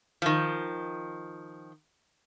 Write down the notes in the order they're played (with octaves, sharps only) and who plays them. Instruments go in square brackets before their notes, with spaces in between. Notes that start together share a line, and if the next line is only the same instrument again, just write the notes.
[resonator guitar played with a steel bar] D#3 F3